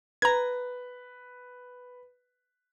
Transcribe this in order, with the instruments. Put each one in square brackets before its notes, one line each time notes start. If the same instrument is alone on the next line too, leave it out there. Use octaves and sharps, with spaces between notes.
[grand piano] B4 [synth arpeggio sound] A#5 G#6